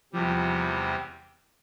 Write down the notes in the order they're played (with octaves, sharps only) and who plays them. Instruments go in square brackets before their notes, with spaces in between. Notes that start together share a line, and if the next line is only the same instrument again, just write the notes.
[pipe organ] E2 C3 G3 [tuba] F3